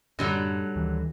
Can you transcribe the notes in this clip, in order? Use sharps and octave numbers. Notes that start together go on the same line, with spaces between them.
F#2 A2 D3 F#3 G3
D2 D#3 E3